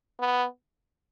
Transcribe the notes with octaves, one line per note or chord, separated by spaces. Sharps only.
B3